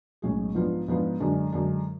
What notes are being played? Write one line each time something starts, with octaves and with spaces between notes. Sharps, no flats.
B1 A2 G#3 C#4 G#4
G#2 F3 B3 D4 F4
G#2 F3 B3 D4 F4
F#2 D3 G#3 D4
F#2 D3 G#3 D4